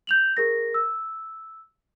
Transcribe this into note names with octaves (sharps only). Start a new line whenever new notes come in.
G6 F7 F#7
G#4 A#4 A#6
E6